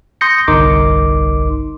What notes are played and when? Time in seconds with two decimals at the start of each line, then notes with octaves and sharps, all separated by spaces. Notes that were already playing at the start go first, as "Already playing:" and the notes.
0.21 C6 D#6 G6 A#6 C#7
0.48 G1 C2 D#4 A#4 C6 D6